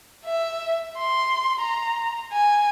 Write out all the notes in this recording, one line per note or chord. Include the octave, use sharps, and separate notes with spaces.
E5
C6
A#5
G#5